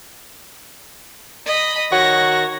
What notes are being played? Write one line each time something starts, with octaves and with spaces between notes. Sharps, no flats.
D#5 B5
D#3 F#4 C#5 A#6